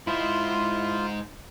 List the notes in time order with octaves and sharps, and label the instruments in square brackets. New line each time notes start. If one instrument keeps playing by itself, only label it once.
[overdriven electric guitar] G#2 C5 [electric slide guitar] E4 [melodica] F4